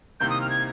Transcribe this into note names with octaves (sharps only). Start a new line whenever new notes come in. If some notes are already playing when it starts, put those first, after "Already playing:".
C2 C3 D#3 A#3 G6
D#6
F6
G#6